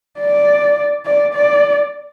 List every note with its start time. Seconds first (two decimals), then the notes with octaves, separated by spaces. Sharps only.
0.20 D5
1.06 D5
1.34 D5